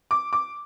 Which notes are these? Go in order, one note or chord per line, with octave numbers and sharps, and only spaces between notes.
D6
D6